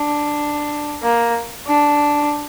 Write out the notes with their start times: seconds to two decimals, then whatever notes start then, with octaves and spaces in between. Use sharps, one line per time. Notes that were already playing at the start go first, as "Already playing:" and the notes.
Already playing: D4
1.02 A#3
1.67 D4